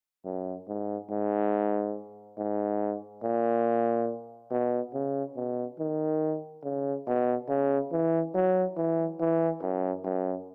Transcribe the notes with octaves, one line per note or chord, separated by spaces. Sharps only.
F#2
G#2
G#2
G#2
A#2
B2
C#3
B2
D#3
C#3
B2
C#3
E3
F#3
E3
E3
F#2
F#2